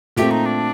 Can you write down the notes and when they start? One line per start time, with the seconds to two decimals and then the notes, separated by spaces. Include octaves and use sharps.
0.16 A#2 A3 C4 G4
0.31 D#4
0.45 D4